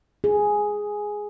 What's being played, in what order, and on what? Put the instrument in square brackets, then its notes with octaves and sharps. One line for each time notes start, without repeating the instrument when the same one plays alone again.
[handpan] G#4